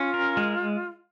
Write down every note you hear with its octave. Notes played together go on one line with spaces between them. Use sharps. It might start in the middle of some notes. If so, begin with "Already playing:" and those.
Already playing: C#4 F4
A#4
G#3